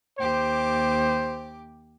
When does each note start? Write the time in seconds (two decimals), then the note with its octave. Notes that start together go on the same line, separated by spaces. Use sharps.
0.18 D#2 G4 C5 D6